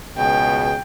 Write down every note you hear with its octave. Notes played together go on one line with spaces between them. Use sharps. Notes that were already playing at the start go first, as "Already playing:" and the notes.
C#2 B2 G#4 G5